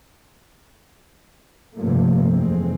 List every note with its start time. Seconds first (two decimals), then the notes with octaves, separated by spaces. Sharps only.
1.75 C#2 G2 C3 F3 A3 A#3
2.30 F1 F2 E3 G#3 C4